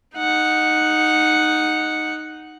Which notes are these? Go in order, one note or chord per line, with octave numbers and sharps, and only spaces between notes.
D#4 F#5